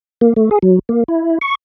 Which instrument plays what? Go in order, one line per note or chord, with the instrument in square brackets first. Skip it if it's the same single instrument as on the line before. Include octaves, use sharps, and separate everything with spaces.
[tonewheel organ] A#3
A3
G#4
F#3
A#3
E4
C#6